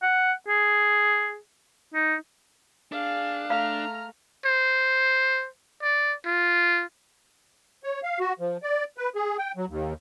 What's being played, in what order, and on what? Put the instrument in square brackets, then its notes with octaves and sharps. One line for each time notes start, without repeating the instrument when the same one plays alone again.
[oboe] F#5
G#4
D#4
[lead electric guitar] D4 [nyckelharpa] G#4 F5
[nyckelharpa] A3 [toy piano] F5 [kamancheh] A#5 F6
[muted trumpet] C5
D5
F4
[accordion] C#5
F5
F#4
F3
D5
B4
G#4
G5
F#3
D#2